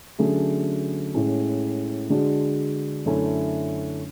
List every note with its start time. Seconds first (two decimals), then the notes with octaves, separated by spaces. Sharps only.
0.18 D3 F#3 A3 C#4 G#4
1.14 A2 G#3 C#4
2.10 D3 G#3 D4 F#4
3.06 F#2 D3 A3 C#4 E4